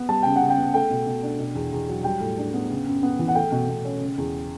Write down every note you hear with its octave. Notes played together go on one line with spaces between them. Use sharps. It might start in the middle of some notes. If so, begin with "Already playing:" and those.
Already playing: B3
G3 A5
C#3 G5
F#5
C#3
G5
B3
A3 G5
B2
B2
D4
B2
E2
E2
F#3
G3 G5
A2
D4
B3
C#3
F#2
B3
E3
F#5
A3 G5
B2
B2
C#4
C#3
E2